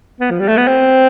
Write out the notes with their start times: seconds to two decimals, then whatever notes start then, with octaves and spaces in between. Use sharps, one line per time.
0.21 B3
0.30 F3
0.40 G3
0.48 A3
0.57 B3
0.67 C4